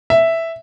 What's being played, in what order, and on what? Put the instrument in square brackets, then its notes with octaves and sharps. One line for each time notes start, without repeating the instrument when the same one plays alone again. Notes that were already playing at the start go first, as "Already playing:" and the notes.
[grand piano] E5